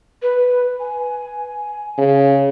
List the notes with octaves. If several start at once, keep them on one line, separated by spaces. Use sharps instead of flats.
B4
G#5
C#3